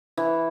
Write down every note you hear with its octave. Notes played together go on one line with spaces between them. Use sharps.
E3